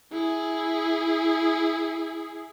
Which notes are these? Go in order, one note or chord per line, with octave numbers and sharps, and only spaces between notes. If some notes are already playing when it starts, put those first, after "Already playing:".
E4 G#4